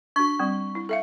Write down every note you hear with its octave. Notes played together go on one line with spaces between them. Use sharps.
D4 F#4 C#6
G3 C4
E4
A4 E5 F5